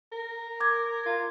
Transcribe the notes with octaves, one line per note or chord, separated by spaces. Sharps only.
A#4
D6 G#6
F4